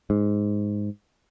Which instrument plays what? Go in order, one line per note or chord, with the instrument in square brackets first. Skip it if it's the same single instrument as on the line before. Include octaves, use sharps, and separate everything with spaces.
[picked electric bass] G#2